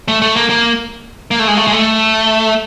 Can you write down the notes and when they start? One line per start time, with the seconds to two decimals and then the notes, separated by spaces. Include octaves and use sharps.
0.08 A3
0.22 A3
0.36 A#3
0.50 A#3
1.31 A#3
1.39 A3
1.47 G#3
1.57 A3
1.67 G#3
1.72 A3